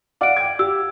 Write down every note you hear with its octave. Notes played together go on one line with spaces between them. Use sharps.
D5 F5 F#5 D6 D7
G5 G#6
G4 E6